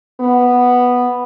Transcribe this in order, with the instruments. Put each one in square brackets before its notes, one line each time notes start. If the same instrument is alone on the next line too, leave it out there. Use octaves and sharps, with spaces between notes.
[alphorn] B3